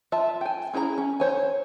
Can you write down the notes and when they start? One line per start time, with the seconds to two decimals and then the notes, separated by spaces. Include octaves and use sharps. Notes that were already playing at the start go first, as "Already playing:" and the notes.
0.12 F4 E5 A5
0.41 G5 G#5
0.73 C#4 E4 G#4 C#5 A#5
0.98 C#4
1.20 C5 C#5 G#5